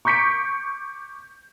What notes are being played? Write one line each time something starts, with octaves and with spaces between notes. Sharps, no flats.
C#6 D6 G6 B6 C#7 D7